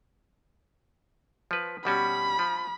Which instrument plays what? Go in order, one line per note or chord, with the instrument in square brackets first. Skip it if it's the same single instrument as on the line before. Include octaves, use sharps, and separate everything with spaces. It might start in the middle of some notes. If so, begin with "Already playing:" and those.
[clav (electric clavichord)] F3 B4
[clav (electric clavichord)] B2 G3 C#4 [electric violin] B5
[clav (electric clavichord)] F3